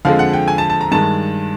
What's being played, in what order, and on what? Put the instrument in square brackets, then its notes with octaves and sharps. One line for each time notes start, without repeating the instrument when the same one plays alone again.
[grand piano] F2 D3 F3 G#3 F5
F#5
G5
G#5
A5
A5
A#5
G2 D#3 G#3 A5